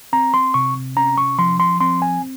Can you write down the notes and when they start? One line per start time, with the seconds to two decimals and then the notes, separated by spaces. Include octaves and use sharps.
0.13 C4 A#5
0.34 C6
0.54 C3 C#6
0.97 C#4 A#5
1.18 C#6
1.38 F3 C6
1.60 C6
1.81 C4 C6
2.02 G#5